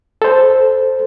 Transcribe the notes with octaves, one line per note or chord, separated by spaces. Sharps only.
A4 C5